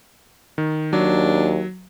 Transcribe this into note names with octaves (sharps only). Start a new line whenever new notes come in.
D#3
D#2 F#3 D4